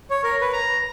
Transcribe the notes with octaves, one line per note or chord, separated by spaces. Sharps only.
C#5
A#4
B4
A#5